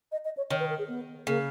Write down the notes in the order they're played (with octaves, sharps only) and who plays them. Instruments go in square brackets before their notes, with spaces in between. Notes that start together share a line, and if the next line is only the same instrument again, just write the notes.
[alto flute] D#5
D#5
C#5
[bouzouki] D#3 [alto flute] C#5
[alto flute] B4
A#4
G#4
B3
[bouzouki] C#3 [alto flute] A#3